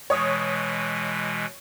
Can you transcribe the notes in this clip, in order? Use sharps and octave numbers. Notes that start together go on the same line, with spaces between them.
B2 E3 G#3 C#5 D#6